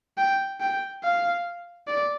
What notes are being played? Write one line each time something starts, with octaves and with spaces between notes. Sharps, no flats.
G5
G5
F5
D5